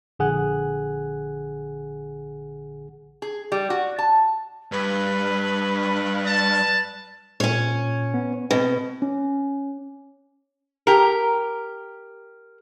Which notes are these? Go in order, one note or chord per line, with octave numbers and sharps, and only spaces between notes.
A#1 D3 G#4 F#5 G#5 F#6
G#4
G3
F#4
A5
G2 B4
A5
A#2 C#4 C#5
B3
B2 C4
C#4
G4 A#4